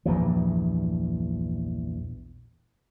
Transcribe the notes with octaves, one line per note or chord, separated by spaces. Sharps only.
A#1 E2 G2 E3